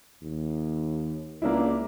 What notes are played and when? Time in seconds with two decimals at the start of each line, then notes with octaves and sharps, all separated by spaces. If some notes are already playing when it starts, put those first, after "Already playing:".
0.22 D#2
1.42 C#2 A#3 D4 E4